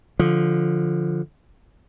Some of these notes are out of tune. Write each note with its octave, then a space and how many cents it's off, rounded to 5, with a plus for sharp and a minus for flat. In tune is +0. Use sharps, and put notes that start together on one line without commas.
D3 +0 F3 +0